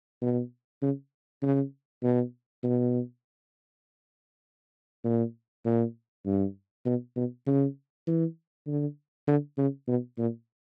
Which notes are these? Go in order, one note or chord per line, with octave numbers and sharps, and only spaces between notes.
B2
C#3
C#3
B2
B2
A#2
A#2
G2
B2
B2
C#3
E3
D3
D3
C#3
B2
A#2